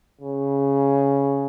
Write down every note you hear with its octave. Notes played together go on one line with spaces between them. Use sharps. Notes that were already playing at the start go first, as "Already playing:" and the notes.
C#3